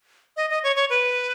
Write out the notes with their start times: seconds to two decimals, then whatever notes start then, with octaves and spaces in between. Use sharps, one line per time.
0.37 D#5
0.50 D#5
0.63 C#5
0.76 C#5
0.90 B4